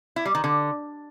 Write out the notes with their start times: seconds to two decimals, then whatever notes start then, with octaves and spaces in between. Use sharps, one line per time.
0.16 E4
0.25 G3
0.35 D#3
0.44 D3